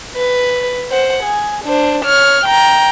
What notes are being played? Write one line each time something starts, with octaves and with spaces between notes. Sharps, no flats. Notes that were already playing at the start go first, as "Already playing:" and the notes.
B4
C5 F#5
G#4
D4 C5
C#5 F6
G5 A#5